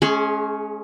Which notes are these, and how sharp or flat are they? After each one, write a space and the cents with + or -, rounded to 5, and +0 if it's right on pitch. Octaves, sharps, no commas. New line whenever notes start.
G#3 +40 C#4 +0 G#4 +0